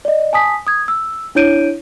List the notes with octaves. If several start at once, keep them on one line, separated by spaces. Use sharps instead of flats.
D5 D#5
G#5 A5 D#6 B6
D#6 G#6
E6
D4 E4 C#5 G6 D7 D#7